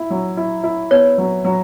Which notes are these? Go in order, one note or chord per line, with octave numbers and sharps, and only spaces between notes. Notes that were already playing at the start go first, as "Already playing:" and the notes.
Already playing: E4
F#3
E4
E4
B3 C#5
F#3
F#3